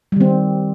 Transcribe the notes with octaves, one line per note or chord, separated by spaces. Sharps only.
D#3 G3 C4